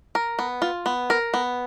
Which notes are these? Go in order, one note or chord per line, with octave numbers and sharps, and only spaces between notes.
A#4
B3
F4
B3
A#4
B3